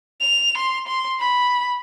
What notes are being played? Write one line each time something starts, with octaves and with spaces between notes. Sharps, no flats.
F7
C6
C6
B5